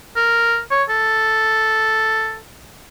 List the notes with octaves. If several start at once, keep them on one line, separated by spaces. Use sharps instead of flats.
A#4
C#5
A4